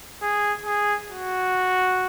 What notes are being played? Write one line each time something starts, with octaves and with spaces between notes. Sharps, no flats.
G#4
G#4
F#4